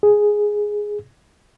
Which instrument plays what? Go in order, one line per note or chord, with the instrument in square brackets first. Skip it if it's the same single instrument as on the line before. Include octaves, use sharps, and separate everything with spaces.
[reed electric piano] G#4